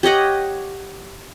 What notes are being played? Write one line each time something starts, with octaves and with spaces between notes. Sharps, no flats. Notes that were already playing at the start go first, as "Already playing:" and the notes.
G4 C#5 D#5 F#5